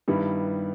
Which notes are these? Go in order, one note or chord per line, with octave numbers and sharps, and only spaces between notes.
G2 D#3 G3 B3 E4